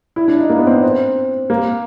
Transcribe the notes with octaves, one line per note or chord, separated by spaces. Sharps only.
E4
D4
D#4
A#3
B3
C4
C4
A#3